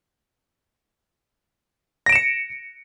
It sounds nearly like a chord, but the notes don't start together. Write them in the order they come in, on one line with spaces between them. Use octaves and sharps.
A#6 D7 E7 C#7